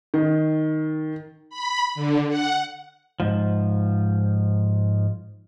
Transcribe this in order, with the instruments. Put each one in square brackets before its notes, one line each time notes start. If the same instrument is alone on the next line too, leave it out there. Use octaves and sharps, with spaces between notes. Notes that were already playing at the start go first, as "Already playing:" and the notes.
[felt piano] D#3
[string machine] B5
D3
F#5
[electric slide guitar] G#2 F3